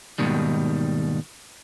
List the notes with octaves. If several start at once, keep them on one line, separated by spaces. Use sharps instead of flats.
D#2 G#2 B2 D#3 G3